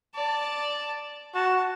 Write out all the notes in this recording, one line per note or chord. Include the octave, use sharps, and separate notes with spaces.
D5 A5
F#4 A5